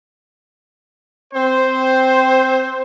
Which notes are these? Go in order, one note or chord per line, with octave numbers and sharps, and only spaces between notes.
C4 C5